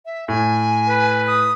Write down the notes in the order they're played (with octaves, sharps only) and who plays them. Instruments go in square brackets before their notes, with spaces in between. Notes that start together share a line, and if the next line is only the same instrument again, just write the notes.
[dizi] E5
[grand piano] A2 [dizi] G#5
[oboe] B4
[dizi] D#6